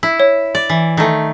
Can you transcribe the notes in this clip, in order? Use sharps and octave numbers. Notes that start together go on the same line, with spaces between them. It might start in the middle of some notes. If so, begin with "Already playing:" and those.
E4
C#5
D5
E3
D#3 A3